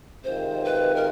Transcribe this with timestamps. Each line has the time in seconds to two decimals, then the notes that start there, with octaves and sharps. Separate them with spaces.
0.24 C3 D#3 G#3 C4 F4 C5
0.64 B4
0.95 A#4